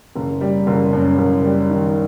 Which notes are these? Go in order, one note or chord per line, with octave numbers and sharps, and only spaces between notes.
F#1
G3
F#1
F#2
F#1
G3
D#3